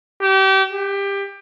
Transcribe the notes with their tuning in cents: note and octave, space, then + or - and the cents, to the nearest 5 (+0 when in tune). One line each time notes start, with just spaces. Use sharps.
G4 -30
G4 +20